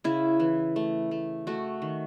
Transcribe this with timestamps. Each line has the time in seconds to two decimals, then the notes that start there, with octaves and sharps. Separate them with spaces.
0.04 C#3 E4
0.40 E3
0.76 A3
1.11 A3
1.47 A3 F#4
1.82 D#3